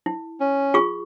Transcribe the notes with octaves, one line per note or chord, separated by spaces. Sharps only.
E4
C#4
F4 G#4 C#6